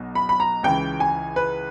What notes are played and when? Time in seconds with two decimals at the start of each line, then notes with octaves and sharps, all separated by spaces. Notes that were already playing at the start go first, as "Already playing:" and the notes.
Already playing: B1 B2
0.15 B5
0.29 B5
0.40 A#5
0.63 C#2 C#3 E3 G5
1.00 G#5
1.36 B4